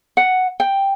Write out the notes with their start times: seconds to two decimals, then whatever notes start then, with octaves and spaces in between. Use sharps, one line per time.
0.17 F#5
0.60 G5